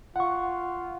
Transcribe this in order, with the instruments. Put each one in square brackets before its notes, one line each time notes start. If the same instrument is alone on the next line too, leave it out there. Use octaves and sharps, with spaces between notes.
[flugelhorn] F4 [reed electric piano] F#5 C#6